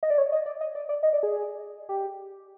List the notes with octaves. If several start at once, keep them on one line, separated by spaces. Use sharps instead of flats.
D#5
D5
C#5
D#5
D5
D#5
D5
D5
D#5
D5
G#4
G4